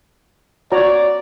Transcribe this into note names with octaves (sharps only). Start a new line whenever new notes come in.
F#4 C#5 D5 A#5